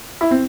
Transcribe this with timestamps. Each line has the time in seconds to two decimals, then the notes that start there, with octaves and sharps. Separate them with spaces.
0.21 E4
0.31 C4